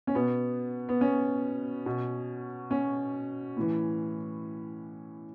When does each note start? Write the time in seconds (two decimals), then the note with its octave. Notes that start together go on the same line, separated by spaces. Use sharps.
0.07 C#4
0.15 B2 B3
0.89 B3
1.01 C#4
1.86 B2
2.71 C#4
3.57 A2 E3